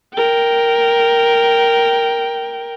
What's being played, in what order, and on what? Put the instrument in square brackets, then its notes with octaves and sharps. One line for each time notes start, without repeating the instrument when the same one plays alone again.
[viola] A#4 G5